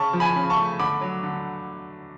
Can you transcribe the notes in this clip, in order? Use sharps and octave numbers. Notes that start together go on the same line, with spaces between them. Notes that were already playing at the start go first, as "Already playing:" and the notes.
Already playing: C#3 A5 C#6
F3
G#5 B5
C#3
A5 C#6
A3
D3 B5 D6
F#3
D3